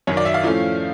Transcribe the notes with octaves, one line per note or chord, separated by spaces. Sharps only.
F#2 D#3 F#3 C#5
D5
E5
F5
A2 F3 A3 C#4